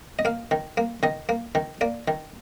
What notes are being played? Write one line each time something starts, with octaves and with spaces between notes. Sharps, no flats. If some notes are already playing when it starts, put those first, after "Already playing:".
D#5
A#3 F5
D#3
A#3
D#3 D#5
A#3
D#3
A#3 D5
D#3